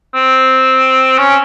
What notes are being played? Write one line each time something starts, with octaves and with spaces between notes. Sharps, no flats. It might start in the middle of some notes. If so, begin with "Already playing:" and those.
C4
C#4